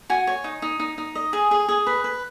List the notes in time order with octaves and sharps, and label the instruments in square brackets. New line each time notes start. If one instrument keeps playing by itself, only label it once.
[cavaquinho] F#4 G#5
C#5
D#4
D#4
D#4
D#4
D#5
G#4
G#4
G#4
B4
B4